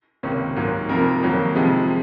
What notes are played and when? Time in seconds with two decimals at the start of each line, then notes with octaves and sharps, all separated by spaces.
0.23 C#2 C3 D#3 A#3 C#4
0.56 G#2 F#3 A#3
0.89 F2 C3 F3 A#3 A#4
1.22 F2 D#3 F#3 A#3
1.55 F2 C3 F3 G#3